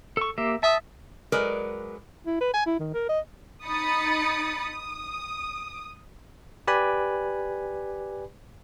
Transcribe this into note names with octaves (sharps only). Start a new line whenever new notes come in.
A4 C#6
A#3 G4 E5
E5 A5 D#6
F#3 G#3 A#4 B4 D5
E4
B4
G#5
E4
D#3
A#4
D#5
D#4 B5 D#6 A6 C#7
D#6
G4 B4 D5 G#5 B5